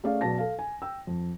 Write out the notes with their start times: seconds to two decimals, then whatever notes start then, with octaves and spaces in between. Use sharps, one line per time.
0.04 A3 C#4 G#4 D5 F5
0.21 B2 F#3 D5 A5 A#6
0.38 A4 F5
0.59 G#5
0.82 G5 E6
1.07 F2